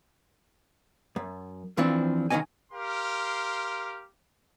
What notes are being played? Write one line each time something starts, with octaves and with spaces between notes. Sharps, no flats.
F#2
F2 E3 F3 C4 D4
B1 D#3 G#3 C#4 D#5 G#5
G4 A#4 F5 C6